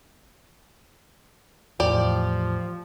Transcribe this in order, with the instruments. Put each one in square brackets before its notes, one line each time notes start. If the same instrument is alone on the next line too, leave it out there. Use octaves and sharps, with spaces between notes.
[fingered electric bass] E2 A2 [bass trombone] F3 [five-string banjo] G4 D5